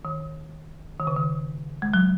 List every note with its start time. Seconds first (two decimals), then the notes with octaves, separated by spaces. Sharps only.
0.05 D#3
1.00 D#3
1.07 C#3
1.16 D#3
1.82 G#3
1.94 F#3